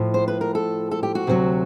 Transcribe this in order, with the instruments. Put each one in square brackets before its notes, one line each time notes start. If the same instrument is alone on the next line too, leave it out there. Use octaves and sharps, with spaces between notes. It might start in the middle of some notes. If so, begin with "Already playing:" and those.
Already playing: [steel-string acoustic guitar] A2 F3
C5
B4
A#4
A4
A4
G4
F#4
D2 C3 D#3 F#3